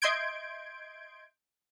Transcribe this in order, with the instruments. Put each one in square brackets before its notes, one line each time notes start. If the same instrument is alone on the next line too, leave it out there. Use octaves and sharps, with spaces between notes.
[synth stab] D#5 E5 C6 G6 G#6 D7